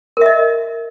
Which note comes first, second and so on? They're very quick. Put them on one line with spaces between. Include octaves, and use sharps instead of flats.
A#4 E5 D#5